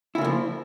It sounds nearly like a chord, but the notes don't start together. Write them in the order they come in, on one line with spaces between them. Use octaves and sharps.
E4 C#3 A#3 F3